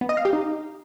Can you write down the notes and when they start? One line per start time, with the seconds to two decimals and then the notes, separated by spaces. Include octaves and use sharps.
0.01 B3
0.09 D#5
0.17 F5
0.25 G4
0.33 D#4